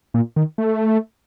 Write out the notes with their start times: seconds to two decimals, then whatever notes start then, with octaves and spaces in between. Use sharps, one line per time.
0.14 A#2
0.36 D#3
0.58 A3